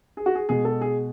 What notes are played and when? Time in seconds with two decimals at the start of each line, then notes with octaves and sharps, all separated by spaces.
0.17 G#4
0.26 F#4
0.35 G#4
0.49 B2 G#3 G#4
0.65 A4
0.81 G#4